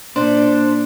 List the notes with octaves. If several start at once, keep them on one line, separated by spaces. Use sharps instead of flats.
A#2 D4 C5